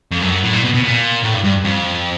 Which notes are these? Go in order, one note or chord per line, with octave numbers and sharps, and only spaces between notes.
F2
F#2
A2
A#2
B2
B2
A#2
A2
G2
G2
F2